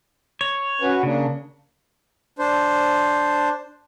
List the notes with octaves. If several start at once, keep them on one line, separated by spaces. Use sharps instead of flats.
C#5
C#4 F#4 B4
C#3 A#3 D4
D4 C5